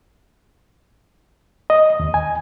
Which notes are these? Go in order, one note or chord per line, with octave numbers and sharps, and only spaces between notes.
D#5
D#2
G#5